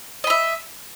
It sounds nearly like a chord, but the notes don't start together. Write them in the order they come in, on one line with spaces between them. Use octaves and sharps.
D#5 B5 E5